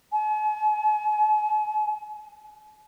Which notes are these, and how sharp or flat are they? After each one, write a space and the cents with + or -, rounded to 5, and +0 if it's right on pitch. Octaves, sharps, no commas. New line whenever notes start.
G#5 +45